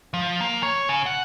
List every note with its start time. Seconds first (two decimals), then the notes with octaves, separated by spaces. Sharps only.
0.14 F3
0.41 A#3
0.63 C#5
0.89 C#3
1.06 F#5